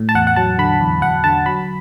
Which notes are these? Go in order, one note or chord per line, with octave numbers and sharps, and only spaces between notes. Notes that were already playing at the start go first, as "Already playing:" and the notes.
Already playing: A2
A5
E2 F#5
F#5
F#3 A5
D3 B5
E2
E2 F#5
D3 A5
F#3 B5